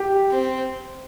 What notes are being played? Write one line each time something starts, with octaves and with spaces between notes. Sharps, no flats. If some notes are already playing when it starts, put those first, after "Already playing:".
Already playing: G4
C4